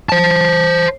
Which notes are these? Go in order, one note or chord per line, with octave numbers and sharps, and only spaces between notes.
C5 A5